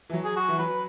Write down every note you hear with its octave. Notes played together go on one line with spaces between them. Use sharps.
E3
F#3
G#4
F#4
E3
F#3 B4